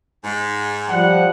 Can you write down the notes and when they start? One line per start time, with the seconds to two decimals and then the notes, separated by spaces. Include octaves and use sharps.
0.24 G#2
0.90 F3 G3 F#5